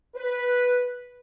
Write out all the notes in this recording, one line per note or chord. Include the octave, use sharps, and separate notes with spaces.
B4